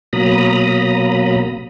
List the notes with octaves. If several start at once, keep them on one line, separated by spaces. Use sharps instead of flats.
B2 F#3 A#3 A#5 B5 D#6